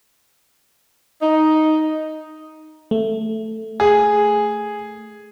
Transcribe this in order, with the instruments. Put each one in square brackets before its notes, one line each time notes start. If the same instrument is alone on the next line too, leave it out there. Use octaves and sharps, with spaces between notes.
[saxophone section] D#4
[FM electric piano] A3
[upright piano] G#4